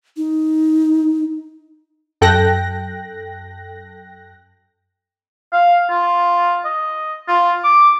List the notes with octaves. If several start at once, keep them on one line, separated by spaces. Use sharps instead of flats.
D#4
F#2 A4 G5 F#6 A#6
F5
F4
D#5
F4
D6